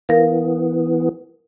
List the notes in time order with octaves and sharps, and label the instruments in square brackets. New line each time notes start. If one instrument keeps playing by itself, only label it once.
[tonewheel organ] E3 B3 [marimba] A#4 F5